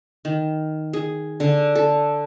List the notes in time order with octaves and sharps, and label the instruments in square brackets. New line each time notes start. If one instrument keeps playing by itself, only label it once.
[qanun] D#3
G#4
D3
A4